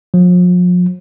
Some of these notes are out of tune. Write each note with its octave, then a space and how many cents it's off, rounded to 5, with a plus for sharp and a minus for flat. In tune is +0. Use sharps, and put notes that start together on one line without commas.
F3 +40